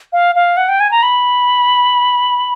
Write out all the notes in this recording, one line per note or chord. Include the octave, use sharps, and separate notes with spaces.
F5
F5
F#5
G5
G#5
A#5
B5